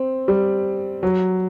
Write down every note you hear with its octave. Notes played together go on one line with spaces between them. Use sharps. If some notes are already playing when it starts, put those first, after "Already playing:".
Already playing: C4
G3
F#3